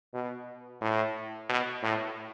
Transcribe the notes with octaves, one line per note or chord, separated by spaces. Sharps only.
B2
A2
B2
A2